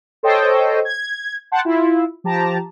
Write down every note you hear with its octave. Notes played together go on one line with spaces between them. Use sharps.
A4 C5 C#5 D#5 G5
G#6
F#5 G5 A5 C6
E4 F4
F3 G4 A5 A#5